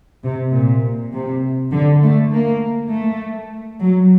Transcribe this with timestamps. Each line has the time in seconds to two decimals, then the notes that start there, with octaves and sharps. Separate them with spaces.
0.24 C3
0.53 A#2
1.13 C3
1.73 D3
2.03 A3
2.32 A#3
2.92 A3
3.82 F#3